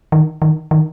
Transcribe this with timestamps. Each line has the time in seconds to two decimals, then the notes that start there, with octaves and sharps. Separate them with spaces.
0.12 D#3
0.42 D#3
0.71 D#3